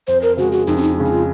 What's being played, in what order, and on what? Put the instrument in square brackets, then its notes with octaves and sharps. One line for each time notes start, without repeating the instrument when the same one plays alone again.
[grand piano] F2 [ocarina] C5
[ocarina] A#4
[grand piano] C#3 G#3 [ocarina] F#4
[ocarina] F#4
[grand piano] F2 [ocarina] D#4
[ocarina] C#4
D#4
[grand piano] C#3 G#3
[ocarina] D#4
F4